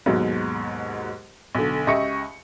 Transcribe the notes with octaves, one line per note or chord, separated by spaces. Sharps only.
D#2 G#2 B2 F#3
B1 D3
C#2 G4 D#5 E5 C#6 C#7